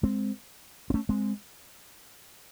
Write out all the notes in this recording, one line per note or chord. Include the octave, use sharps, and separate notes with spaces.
G#3 C4
C4
A3 C#4
G#3 C4